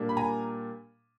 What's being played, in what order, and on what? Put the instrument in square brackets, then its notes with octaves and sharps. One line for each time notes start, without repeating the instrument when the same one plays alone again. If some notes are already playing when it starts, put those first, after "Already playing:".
Already playing: [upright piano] A#2 G3 A#3 D4
B5
G#5 A#5